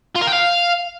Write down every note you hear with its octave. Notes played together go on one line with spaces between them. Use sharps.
F4
A#4
G5
F5